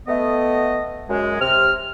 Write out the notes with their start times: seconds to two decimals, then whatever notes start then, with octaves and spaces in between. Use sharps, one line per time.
0.08 A3 B3 D#5
1.09 F#2 G#3
1.41 C3 F6